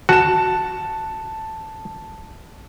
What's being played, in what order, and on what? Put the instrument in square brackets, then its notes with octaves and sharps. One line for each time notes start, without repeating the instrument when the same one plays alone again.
[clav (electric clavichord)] F#4 [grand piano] A5 E7